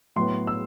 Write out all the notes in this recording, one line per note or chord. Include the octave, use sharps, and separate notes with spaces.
A2 F#3 B3 C6
E6